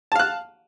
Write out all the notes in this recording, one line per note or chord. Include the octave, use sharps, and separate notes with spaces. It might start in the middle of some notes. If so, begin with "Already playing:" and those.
F5 A5 F#6